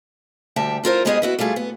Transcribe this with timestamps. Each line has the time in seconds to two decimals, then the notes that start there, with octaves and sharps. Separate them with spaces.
0.56 D2 G3 E5 G5 A5
0.84 E4 F4 A#4 C5
1.05 G#3 B3 G4 G#4 A#4 D#5
1.22 B3 E4 F#4
1.39 G3 A3 F4 G#4
1.56 B3